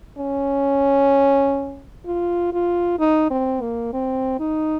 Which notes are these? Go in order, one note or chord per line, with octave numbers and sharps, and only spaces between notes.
C#4
F4
F4
D#4
C4
A#3
C4
D#4